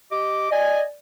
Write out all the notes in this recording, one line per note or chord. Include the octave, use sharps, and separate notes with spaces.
G4 D#5 D6
D5 D#5 G#5